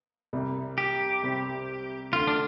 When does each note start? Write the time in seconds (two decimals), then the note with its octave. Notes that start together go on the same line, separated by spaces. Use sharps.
0.33 C2 C3 G3
0.78 G4
1.23 C2 C3 G3 C4
2.12 D2 D3 A3 F4
2.27 D4